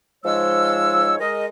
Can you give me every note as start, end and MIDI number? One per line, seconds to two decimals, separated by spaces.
0.24 1.15 44
0.24 1.15 53
0.24 1.15 56
0.24 1.15 73
0.24 1.15 88
1.20 1.46 56
1.20 1.46 70
1.20 1.46 75